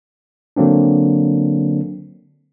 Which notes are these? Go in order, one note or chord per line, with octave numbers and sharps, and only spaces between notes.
D3 F#3 A#3 C4 D4